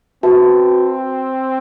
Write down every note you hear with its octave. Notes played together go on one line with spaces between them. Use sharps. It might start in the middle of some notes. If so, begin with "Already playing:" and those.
C4 F#4 B4 E5 A5